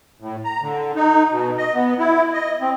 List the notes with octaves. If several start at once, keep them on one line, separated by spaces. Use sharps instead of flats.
A2
A#5
D3
D#4
B2
D#5
B3
E4
D#5
C4